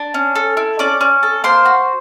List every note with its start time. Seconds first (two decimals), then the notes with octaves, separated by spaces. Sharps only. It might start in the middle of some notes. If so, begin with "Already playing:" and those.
Already playing: D4
0.14 C#4
0.35 A4
0.57 E4
0.79 C#4 D5 D6
1.01 C#4
1.23 A4
1.44 A#3 C5 C6
1.65 F#4